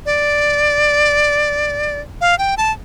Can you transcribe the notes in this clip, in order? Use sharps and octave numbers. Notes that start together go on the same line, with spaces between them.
D5
F5
G5
A5